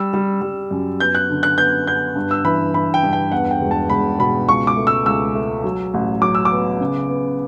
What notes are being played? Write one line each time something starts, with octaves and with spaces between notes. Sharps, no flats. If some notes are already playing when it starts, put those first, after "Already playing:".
Already playing: G3 E6
G3
G3
F#2
B3 G6
F#6
D3
F#6
B3 G6
B3 G6
G2
E6
E3 B5
E3 B5
G5
G2
G5
E2 F#5
G5
E1
A5
E1 B5
B2 B5
C#2 C#6
D6
A3
E6
C#2 E6
A3
F#3
A1
F#3 D6
E6
D6
B3
C#3
B3